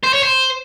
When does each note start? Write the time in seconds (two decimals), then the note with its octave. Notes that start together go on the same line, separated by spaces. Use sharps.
0.04 C5
0.13 C#5
0.23 C5